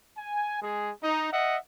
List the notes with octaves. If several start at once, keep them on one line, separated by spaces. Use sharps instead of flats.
G#5
G#3 G#4
D#4
D#5 E5 F#5